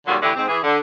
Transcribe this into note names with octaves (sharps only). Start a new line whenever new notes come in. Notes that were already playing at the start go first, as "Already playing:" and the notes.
D#2 A#2 D3 F#3 G3
A2 D3 E3 E4 G4
G#2 C4
E3 G#4
D3